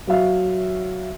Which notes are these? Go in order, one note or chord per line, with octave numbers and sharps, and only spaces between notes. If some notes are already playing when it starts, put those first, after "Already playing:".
F#3 F#4 E5 F5